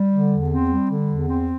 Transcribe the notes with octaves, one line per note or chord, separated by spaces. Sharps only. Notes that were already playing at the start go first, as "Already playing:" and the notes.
Already playing: G3
D3
E2
C4
G3
D3
E2
C4